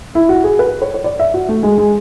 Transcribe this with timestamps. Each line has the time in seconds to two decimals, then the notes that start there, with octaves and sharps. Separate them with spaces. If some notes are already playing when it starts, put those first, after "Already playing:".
0.15 E4
0.29 F#4
0.44 G#4
0.59 B4
0.82 C#5
0.94 C#5
1.04 D5
1.20 E5
1.34 F#4
1.49 A3
1.63 G#3
1.78 G#3